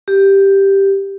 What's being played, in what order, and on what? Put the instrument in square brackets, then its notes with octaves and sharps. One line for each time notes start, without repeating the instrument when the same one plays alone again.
[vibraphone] G4